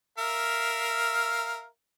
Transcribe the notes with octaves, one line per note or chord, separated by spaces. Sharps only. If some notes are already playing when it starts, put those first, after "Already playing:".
A#4 E5 F5